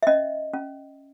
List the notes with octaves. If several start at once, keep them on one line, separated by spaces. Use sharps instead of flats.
E5
C#4 D#5
C#4